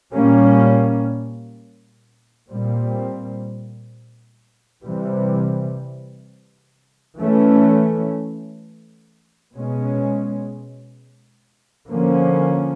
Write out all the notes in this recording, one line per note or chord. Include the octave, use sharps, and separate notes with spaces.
A#2 G3 A#3 C#4
A#2 G3 C4
C3 E3 G3
E3 A3 C#4
B2 G#3 C#4
D3 F3 A#3 C#4